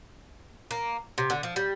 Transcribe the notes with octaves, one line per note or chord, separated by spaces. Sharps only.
A#3
C3
D3
F3
G3